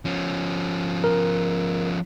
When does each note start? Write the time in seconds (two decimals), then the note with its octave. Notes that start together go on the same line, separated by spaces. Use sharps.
0.05 F3 C#4
1.04 A#4